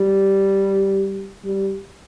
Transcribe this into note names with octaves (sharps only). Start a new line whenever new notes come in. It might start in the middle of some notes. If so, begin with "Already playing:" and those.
Already playing: G3
G3